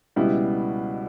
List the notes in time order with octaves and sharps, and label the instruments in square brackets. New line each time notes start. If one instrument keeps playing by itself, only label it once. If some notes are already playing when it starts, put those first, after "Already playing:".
[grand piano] C#2 B2 G3 B3 E4